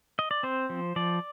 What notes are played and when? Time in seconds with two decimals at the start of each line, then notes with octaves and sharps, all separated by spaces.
0.19 D#5
0.31 D5
0.43 C4 C5
0.70 F3
0.96 F3 D5